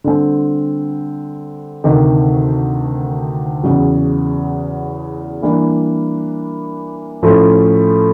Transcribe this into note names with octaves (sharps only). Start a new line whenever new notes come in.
D3 G3 C4
D2 C3 D#3
E2 C#3 F#3
E3 G3 A#3 D4
A2 F3 A3 C#4 F4